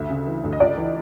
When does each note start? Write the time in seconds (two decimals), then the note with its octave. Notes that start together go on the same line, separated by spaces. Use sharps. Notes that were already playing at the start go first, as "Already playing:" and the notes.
Already playing: D2 E5
0.09 C#3
0.27 E3
0.44 D2
0.53 D#5
0.60 C#2 D5
0.77 E3